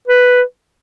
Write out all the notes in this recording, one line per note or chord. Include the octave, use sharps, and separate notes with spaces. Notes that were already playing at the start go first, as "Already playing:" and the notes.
B4